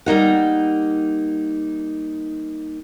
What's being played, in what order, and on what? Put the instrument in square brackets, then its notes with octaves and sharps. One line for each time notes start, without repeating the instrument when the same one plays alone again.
[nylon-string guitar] G3 A#3 D#4 F#5